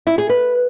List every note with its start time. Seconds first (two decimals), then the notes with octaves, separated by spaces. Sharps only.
0.07 E4
0.18 G#4
0.29 B4